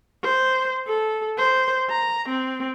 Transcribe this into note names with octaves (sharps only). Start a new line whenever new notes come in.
C5
A4
C5
A#5
C4